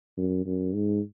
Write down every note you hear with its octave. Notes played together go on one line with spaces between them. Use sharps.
F#2
F#2
G#2